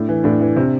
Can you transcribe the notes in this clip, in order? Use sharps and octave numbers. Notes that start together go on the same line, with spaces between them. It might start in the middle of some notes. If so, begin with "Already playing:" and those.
Already playing: A2 D4
E3
A2 D4
E3
C3